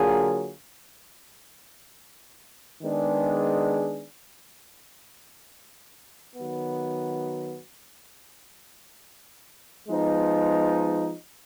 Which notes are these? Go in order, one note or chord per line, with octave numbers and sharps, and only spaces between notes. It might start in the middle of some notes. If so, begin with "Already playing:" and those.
Already playing: D3 F#3 A#3 F4 G#4
D#3 G#3 B3 D4 G#4
D#3 F#3 B3
F3 G#3 B3 D#4